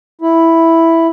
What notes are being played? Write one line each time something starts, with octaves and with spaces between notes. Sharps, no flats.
E4